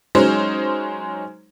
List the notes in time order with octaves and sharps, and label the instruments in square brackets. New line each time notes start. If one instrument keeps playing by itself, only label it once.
[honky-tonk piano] F#3 G#3 C#4 D#4 C5